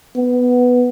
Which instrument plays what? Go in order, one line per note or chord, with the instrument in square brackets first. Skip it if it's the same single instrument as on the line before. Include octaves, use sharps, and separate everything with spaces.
[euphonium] B3